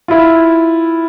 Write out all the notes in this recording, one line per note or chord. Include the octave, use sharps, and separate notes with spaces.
E4 F4